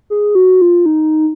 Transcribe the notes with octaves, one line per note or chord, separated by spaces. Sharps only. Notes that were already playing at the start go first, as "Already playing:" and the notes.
G#4
F#4
F4
D#4